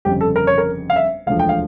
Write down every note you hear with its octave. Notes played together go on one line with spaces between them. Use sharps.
G1 F2 C#3 G4
A4
A#4
C#5
A#4
F5
E5
E1 D2 D3 F3 F5
G5
F5